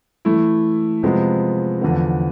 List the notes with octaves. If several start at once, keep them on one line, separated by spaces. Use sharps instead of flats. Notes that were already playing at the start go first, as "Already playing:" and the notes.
E3 A3 E4
C3 F3 G#3 B3
E2 D3 F3 B3